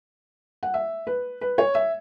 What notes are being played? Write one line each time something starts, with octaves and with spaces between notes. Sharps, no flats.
F#5
E5
B4
B4
C#5
E5